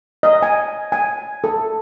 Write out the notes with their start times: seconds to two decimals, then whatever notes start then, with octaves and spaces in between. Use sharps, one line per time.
0.23 D#5
0.43 G#5
0.92 G#5
1.44 A4